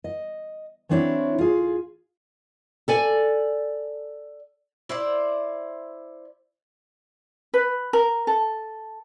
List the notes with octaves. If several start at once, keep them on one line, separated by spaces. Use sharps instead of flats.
D#5
E3 F#3 C4 D4 E4 C#5
F4 G#4
A4 D5 G#5
E4 C5 D5
B4
A#4
A4